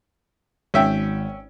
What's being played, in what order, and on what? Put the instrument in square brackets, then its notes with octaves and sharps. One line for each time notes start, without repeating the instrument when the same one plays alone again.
[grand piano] G#1 [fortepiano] C#4 E5 G5